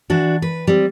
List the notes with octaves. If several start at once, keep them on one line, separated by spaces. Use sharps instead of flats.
E3 D4 F#4
B4
G3 C4